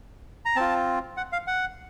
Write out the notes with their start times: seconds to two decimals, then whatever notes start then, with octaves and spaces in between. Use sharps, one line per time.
0.45 A#5
0.56 C4 F4 A5
1.17 F#5
1.33 F5
1.47 F#5